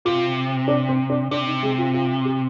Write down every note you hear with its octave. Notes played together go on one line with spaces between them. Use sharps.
C3 F4
D4
C4
D4
C3 D4
D#4
G#3
F4
F4
G4